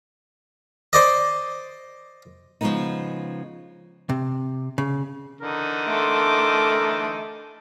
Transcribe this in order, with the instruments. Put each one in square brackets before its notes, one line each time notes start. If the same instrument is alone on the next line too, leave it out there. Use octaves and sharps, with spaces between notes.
[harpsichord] C5 D5 D#5
[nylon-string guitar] C#3 F3 G3 G#3 B3 D#4
[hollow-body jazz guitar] C3
C#3
[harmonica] D3 E3 D#4 [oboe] A#4
[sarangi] A3 [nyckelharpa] C6 D6